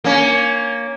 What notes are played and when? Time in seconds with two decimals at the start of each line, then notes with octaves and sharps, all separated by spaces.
0.04 A#3 C#4